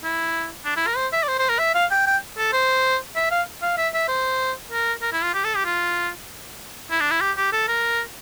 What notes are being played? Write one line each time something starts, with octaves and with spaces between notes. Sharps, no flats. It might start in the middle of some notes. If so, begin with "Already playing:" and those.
E4
D4
E4
A#4
C5
E5
D5
C5
C5
A#4
E5
F5
G5
G5
A4
C5
E5
F5
F5
E5
E5
C5
A#4
A#4
E4
F4
G4
A4
G4
F4
E4
D4
E4
G4
G4
A4
A#4